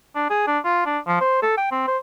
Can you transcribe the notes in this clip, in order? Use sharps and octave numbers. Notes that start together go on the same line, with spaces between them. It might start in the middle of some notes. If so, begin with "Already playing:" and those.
D4
G#4
D4
F4
D4
F3
C5
A4
G5
C4
C5